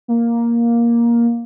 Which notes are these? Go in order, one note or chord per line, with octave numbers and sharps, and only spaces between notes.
A#3